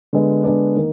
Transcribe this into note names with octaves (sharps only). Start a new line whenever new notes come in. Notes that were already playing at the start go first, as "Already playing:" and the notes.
D3 G#3 B3
D3 G#3 B3 D4
D#3 A#3